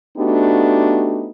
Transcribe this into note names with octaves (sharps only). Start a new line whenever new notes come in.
A3 B3 D4 D#4 F#4 G4